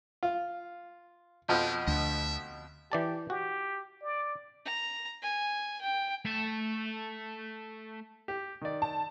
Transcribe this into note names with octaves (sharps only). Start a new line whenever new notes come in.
F4
F2 B2 F3 G4
D2 E5
E3 G4 D5 A5
F#4 G4
D5
A#5
G#5
G5
A3 A5
G4
D#3 D5
A5